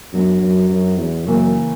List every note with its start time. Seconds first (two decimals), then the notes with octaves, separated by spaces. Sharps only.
0.13 F#2 F#3 B3 D4
0.42 F#2
0.69 F#2
0.98 E2
1.26 F#2 C#3 E3 A#3